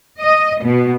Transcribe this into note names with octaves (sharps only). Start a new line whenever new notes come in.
D#5
B2